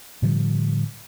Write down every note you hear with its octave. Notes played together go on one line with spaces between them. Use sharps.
A2 D3 F3 G3